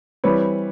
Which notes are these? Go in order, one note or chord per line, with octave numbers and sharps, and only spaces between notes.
E3 G3 C4 B4 C#5